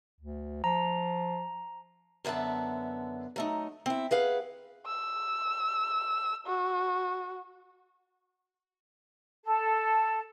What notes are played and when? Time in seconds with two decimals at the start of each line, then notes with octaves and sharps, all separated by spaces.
0.21 D2
0.64 F3 A#5
2.25 F#2 D3 B3 E5 A5
3.36 F#3 A3 D#4
3.86 C4 E4
4.11 G#4 B4 F5 F#5
4.86 E6
6.47 F#4
9.45 A4